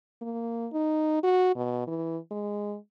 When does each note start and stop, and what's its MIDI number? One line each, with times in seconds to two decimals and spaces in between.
0.22 0.67 58
0.73 1.18 63
1.23 1.53 66
1.56 1.87 47
1.87 2.18 52
2.31 2.76 56